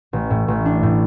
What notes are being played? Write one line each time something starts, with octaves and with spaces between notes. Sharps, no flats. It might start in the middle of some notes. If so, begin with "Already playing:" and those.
A1
A2
A1
D4
A2